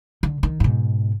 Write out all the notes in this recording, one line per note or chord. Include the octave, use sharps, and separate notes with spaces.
D3
D#3
G#2 B2